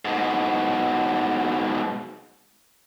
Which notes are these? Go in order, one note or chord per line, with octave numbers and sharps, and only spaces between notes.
G#2 B2